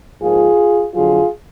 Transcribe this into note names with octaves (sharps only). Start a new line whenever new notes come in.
G#2 F3 A#3 F4 G#4
F2 D3 F#3 F4 G#4